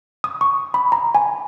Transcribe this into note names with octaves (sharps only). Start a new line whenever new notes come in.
D#6
C#6
B5
A#5
G#5